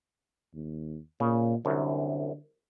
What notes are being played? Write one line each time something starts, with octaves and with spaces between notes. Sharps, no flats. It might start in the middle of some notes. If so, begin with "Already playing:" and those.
D#2
A#2 C#3
C2 F#2 D3